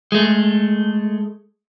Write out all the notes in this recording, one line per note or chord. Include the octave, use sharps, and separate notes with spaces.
G#3 A3